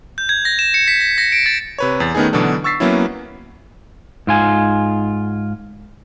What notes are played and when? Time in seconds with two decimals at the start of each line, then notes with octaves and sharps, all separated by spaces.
0.18 G6
0.29 G#6
0.45 A#6
0.59 E7
0.74 C#7
0.88 B6
1.00 A#6
1.18 A#6
1.32 D7
1.46 A6
1.78 C3 B4 C#5
2.00 E2 A6
2.15 D#3 A3 B3 C#4 D#4 G#4
2.33 B2 D3 E3 F#3 D4 A4
2.64 C#6 E6 A6 B6 C7
2.80 F#3 A#3 B3 C#4 E4
4.27 G#2 F4 G#5